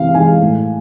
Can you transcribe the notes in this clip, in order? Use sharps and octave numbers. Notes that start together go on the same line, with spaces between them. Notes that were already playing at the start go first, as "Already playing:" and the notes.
Already playing: C3 E3 G#3 F5
E3 G#3 G#5
A2